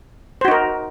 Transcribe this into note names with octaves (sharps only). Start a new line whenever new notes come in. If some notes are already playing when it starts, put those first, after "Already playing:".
D#4 F#4 A#4 C5